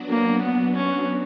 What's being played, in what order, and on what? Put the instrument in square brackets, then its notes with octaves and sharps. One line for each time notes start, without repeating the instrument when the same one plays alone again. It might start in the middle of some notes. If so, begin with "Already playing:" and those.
Already playing: [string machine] F#3 B3 D4 F#4
[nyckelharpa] A#3
B3
C#4